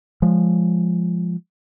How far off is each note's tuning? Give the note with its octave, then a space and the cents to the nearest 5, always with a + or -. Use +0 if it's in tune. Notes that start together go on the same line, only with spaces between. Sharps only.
F3 +0 G#3 +0